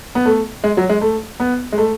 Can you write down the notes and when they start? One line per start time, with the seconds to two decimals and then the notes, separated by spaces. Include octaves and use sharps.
0.15 B3
0.26 A3
0.64 G#3
0.77 F#3
0.89 G#3
1.01 A3
1.40 B3
1.73 G#3
1.78 A3